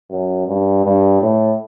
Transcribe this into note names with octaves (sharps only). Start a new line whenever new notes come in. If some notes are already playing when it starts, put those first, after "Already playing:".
F#2
G2
G2
A2